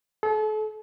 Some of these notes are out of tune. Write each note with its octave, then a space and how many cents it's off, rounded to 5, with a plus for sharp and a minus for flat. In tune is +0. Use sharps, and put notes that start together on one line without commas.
A4 -40